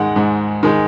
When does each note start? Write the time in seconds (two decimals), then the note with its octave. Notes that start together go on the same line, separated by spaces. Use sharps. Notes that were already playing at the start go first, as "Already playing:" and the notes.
Already playing: G#2 D#3 G#3 F#5
0.16 G#2
0.63 D#3 G#3